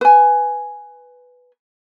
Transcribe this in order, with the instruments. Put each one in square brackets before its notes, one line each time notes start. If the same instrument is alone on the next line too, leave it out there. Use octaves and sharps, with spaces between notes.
[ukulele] B4 G#5